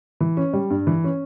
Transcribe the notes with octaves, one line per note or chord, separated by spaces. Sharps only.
E3
C#4
G3
G2
E3
C#4